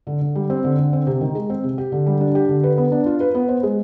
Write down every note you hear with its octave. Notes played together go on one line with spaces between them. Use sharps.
D3
D3
G3
C4
D3
D3
C4
C3
D#3
G#3
C4
C3
G4
D3
G3
D4
G4
D3
B4
B3
D4
F4
B4
B3
C5
G#3